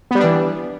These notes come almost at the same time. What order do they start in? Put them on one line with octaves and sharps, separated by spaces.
B3 G3 D4 E3